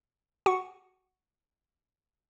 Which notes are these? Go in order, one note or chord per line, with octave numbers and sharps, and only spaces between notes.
F#4 F#5 C#6 C#7